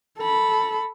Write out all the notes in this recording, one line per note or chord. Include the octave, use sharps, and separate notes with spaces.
A4 B5